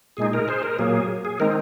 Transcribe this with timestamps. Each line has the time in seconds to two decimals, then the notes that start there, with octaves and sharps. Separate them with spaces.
0.17 A#2 G#3 D#4 G#4
0.33 A#4
0.48 G#4 C5
0.63 A#4
0.79 A#2 F#3 A#3 G#4
1.25 G#4
1.40 D#3 G#3 C4 D#4 A#4